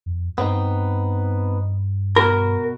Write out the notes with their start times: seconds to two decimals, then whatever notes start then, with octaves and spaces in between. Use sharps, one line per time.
0.06 F2
0.38 G2 B3 C4 D#4
2.16 B2 F#4 A#4 B5